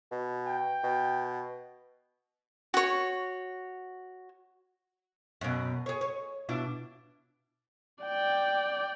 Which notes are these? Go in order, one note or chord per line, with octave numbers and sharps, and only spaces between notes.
B2
G5
B2
F#4 C#5
F#2 B2
G#4 C#5
C#5
B2 D4 E4
D5 G5